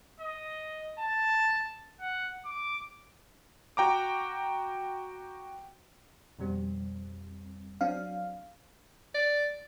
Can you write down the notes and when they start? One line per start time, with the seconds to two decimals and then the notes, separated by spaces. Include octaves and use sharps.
0.21 D#5
1.00 A5
2.01 F#5
2.45 D6
3.77 F#4 G5 A#5 D6
6.39 F2 B2 G3 C4
7.81 F#3 C4 D4 F5
9.15 D5